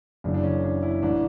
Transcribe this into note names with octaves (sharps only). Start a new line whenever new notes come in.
F#1 F#2 C#3 E3 D4
D4
C#4
D4
E4
A1 E3 D4